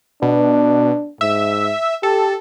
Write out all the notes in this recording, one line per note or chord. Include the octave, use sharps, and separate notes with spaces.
B2 D4
G#2 E5
G4 A4